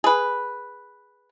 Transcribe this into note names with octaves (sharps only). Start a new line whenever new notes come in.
G#4 B4